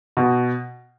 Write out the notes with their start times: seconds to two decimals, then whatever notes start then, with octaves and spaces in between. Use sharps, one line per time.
0.17 B2